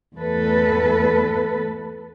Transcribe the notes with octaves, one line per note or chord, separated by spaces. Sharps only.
E2 A3 A4 B4